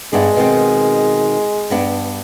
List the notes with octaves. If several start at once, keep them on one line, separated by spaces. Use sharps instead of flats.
G2 G#3 B3 D4
B2 D#3 C4
G2 B3 D4